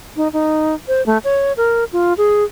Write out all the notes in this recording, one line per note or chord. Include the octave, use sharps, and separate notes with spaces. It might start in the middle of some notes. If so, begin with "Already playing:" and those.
D#4
D#4
C5
A3
C#5
A#4
F4
G#4